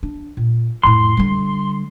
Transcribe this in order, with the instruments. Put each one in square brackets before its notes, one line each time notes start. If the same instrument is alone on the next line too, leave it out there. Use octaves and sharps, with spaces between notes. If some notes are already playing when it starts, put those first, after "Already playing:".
[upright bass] D4
A#2
[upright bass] F2 A2 [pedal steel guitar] C6
[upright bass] D3 G3